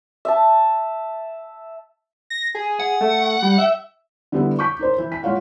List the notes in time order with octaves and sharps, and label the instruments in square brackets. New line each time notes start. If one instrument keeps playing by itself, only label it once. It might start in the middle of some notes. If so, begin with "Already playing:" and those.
[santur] E5 A5
[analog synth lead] A#6
G#4
[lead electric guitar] F#5
[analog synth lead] A3
G3
E5
[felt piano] D3 G3 B3 E4
C#6 D6 G6 B6
D#4 A#4 C5
E3
B6
G#3 F4 C#5 F5 F#5